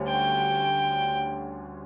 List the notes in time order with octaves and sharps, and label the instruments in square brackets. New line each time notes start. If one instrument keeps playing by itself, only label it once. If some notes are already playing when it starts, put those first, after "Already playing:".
Already playing: [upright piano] D2 D3 G3 C#4
[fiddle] G5